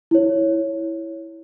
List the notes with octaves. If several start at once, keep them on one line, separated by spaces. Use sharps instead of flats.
E4 C#5